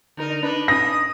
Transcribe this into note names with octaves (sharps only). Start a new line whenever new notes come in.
D3 D#4 A#4
D4 D#4 B4
D#6 A#6